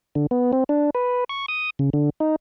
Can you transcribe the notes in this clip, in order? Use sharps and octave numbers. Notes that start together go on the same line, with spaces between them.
D3
B3
C4
D4
B4
C#6
D#6
C#3
D3
D#4